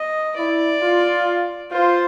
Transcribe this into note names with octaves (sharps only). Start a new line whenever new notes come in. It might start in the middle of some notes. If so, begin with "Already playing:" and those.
Already playing: D#5
E4 D5
F4
F4 C5